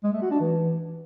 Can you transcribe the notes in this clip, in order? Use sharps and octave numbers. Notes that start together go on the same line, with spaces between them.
G#3
A3
F#4
D4
E3